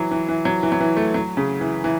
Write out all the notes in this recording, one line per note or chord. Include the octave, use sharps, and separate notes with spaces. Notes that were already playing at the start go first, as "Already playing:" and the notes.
Already playing: E3 F#3
E3
E3
F#3
E3
F#3
E3
A3
F#3
C#3
E3
E3